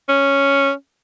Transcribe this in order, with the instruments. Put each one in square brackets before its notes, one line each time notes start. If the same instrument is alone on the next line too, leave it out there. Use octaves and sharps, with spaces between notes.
[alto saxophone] C#4